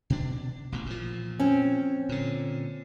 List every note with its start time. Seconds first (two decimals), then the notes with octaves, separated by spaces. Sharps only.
0.10 B2 D4
0.72 A1 B2
0.86 A#2 F3
1.40 C4 C#4
2.09 A#2 D3